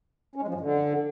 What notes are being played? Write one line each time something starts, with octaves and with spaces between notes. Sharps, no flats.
C#4
G#3
F3
G2
D3